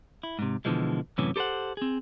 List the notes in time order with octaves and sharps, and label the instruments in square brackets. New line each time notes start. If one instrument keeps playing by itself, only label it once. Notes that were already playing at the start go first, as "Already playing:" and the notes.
[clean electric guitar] E4
G#2 C3
B2 D3 E3 F3 G#3
F#2 A2 C3 E3 C#4
G4 A4 B4 C5 F#5
C4 G#4